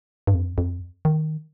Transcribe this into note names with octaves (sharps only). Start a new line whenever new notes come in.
G2
F2
F2
D#3